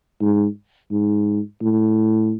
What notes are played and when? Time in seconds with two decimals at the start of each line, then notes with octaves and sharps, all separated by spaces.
0.21 G#2
0.91 G#2
1.62 A2